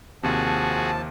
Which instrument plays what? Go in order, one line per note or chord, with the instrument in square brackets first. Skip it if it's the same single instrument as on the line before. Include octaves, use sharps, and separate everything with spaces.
[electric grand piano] D#2 C3 [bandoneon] F3 A5 [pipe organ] F#4 G#4